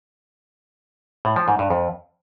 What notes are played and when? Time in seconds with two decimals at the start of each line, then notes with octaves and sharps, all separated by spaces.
1.25 A2
1.36 F3
1.48 G#2
1.59 G2
1.70 F2